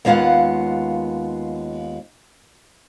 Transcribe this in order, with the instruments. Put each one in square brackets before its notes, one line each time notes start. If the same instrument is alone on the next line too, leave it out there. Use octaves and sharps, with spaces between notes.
[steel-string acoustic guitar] D#2 G#3 B3 F4 F5 F#5